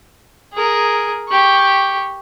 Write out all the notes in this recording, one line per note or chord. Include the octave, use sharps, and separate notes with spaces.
G#4 A#4
G4 C#6